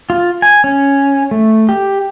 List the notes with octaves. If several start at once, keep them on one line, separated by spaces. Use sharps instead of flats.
F4
G#5
C#4
A3
G4